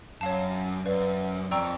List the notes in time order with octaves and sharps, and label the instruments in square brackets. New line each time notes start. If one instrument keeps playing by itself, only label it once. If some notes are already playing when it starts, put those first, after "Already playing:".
[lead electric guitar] F#2 [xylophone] C#5 F5 A5
[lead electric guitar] F#2 [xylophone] B4 D5 F5
[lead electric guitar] F2 [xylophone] D5 G5 A#5 C#6 E6